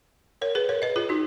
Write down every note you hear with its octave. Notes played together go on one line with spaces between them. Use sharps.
A#4 C#5
G#4 B4
A#4 C#5
B4 D#5
F4 G#4
D#4 F#4